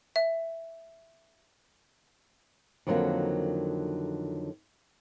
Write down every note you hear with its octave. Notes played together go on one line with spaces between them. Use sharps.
E5
F2 D3 D#3 F#3 G3 A#3